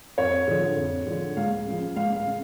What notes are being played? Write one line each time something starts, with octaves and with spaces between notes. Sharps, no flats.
F2 C#5
D3 F3
F2
D3 F3
C#2 F5
C#3 F3
C#2 F5
F5
C#3